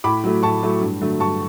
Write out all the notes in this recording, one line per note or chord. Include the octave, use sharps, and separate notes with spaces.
A2 B5 D6
F#3 A3
A2 A5 C#6
F#3 A3
G2
D3 F#3 A3
G2 A5 C#6